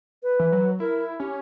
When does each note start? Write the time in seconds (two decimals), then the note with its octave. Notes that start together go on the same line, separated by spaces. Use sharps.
0.23 B4
0.39 E3
0.52 F#3
0.80 E4 A#4
1.20 C#4 G4